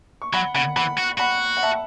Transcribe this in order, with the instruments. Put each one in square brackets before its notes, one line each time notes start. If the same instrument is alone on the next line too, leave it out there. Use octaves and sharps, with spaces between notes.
[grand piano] C#6
[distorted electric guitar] F#3 [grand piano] F#5 B5
[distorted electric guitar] C#3 [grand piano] F#5 B5
[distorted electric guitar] E3 [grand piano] F#5 B5
[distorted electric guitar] F#4
[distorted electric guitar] F#4 [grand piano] F#5 B5
[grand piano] F#5
E5 A5